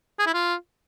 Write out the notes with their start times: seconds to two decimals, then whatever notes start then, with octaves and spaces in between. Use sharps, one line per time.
0.19 G#4
0.26 E4
0.34 F4